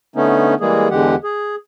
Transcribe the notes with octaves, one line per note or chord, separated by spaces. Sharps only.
D3 A3 B3 C#4 D#4
E3 G3 G#3 A#3 G#4
E2 D3 E3 G#3 G4 F#5
G#4